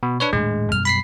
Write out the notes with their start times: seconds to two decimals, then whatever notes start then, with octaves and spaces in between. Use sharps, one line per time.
0.03 B2
0.20 D4 B4 C#5
0.33 D#1 A2 G#3 D4
0.72 F#2 B2 G3 F6
0.85 B5 B6 C7